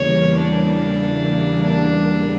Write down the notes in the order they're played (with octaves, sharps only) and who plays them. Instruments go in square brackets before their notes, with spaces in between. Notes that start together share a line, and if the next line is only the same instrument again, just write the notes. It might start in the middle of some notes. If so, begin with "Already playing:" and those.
Already playing: [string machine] E2 C#3 E3 G3 A#3 [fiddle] C#5
[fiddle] D4
D4